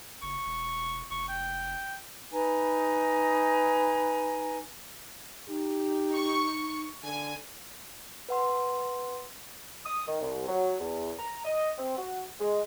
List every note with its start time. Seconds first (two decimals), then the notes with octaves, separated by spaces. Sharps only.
0.23 F#1 C#6
0.46 E1
1.11 F1 C#6
1.29 G5
2.32 D#4 B4 G#5 A#5
5.48 D#4 G4
6.14 C#6
7.04 D3 G#5
8.29 B4 F#5 C6
9.85 D#6
10.08 D#3
10.21 C2
10.48 F#3
10.80 E2
11.19 A#5
11.45 D#5
11.78 C4
11.97 F#4
12.40 G#3